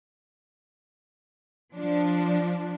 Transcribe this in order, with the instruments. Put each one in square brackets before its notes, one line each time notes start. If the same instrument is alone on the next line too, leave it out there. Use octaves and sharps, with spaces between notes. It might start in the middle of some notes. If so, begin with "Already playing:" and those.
[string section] F3 D4